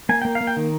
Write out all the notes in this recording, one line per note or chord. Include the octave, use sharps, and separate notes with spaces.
A#3 G#5
A#3 G5
F5
A#3
G5
D#3